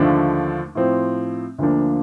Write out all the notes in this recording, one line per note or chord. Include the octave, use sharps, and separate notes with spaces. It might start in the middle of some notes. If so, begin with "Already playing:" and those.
Already playing: D#2 D3 F3 A3 D4
A2 F3 C4
D2 D3 F3 A#3 D4